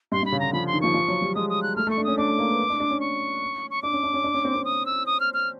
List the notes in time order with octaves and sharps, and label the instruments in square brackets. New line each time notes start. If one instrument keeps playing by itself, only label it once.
[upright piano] G2 [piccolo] C6
[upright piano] G2
[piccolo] B5
[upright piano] C#3
[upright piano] D3 [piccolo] A#5
[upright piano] F3 [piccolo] B5
[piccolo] C6
[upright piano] D#3
[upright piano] F3 [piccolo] C#6
[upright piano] F3
F#3
G3
[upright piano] G#3 [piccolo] D#6
[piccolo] D#6
F#6
[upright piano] A3 [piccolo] F6
[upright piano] A3
[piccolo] C#6
[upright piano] D4
[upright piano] C#4 [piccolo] D#6
[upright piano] D4 [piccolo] D6
[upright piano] A3
A#3
B3
D4
D4
C#4
[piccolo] C#6
C#6
[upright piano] D4 [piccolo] D6
[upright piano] C#4
D4
C#4
D4
C#4
C4
C4
[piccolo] D#6
E6
D#6
F6
F6